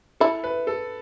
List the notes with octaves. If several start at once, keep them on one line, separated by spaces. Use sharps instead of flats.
E4 A4
B4
A4